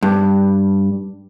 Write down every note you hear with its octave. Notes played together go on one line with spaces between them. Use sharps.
G2